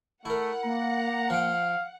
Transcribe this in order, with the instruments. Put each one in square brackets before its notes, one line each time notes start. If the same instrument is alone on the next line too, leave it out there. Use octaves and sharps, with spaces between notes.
[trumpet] A3 [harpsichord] E4 A#4 [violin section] F#5
[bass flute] A#3 [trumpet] A#5
[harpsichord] F3 G5 [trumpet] F5